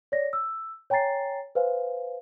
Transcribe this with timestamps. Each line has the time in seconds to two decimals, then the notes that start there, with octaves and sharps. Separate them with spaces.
0.12 C#5 D5 A#6
0.33 E6
0.90 C#5 G5 G#5 A#5 A6 C7
1.55 B4 C5 F5 G#5